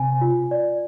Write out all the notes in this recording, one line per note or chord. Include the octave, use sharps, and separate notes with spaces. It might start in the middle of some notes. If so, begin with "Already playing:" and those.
Already playing: C3 G#5
F4
D5